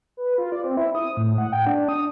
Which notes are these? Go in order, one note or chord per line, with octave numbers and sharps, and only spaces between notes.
B4
F4
D5
C4
E4
D#6
A2
F#5
G5
D4
D#6